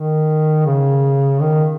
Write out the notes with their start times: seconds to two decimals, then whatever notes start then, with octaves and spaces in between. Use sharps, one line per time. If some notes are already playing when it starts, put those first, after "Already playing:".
Already playing: D#3
0.66 C#3
1.41 D#3